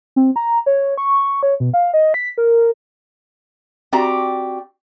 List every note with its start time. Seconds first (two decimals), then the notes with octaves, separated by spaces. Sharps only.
0.16 C4
0.36 A#5
0.66 C#5
0.98 C#6
1.43 C#5
1.60 B2
1.74 F5
1.94 D#5
2.14 B6
2.38 A#4
3.92 C4 F#4 G4 D5 A#5